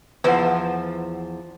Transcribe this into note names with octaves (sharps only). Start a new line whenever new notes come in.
E2 F3 B4 C5 F#5